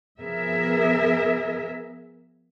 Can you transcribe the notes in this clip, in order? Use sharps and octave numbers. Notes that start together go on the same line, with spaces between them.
F3 B3 G#4 A#4 E5